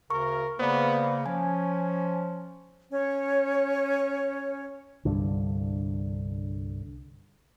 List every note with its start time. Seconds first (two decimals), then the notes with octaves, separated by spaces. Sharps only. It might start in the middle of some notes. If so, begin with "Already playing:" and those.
0.10 D2 C#3 A#4 C#6
0.59 C#3 A#3 B3 C5 D5 B5
1.26 F3 C#4 G#5
2.90 C#4 C#5
5.05 C2 G2 D3